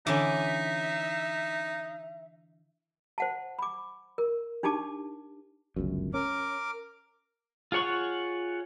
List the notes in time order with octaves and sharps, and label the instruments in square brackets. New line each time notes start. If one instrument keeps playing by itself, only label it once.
[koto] D3 E3 [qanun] C#4 D6 [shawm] D#4 [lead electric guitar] E5
[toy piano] C5 F#5 A5
B5 D6
A#4
D4 D#4 G4 A5 D6
[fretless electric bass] G1 C#2 F#2
[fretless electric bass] C#4 [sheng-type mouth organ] A#4 D6
[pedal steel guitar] F4 G#4 C#5 F#5 C#6